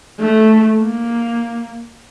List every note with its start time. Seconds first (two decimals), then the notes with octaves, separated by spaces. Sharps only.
0.20 A3
0.80 A#3